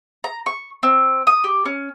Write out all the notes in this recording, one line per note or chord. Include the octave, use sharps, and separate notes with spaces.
A#5
C#6
C4
D#6
G4
C#4